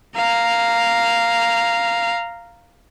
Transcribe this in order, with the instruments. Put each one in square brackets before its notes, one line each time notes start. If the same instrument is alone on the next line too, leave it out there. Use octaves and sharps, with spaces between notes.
[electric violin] F5 A#5